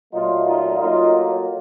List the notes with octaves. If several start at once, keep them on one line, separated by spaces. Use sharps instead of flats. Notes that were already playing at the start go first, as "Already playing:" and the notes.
A#2 F#3 A3 D#4 F4
D#4 F4
A2 F#3 A#3 D#4 F4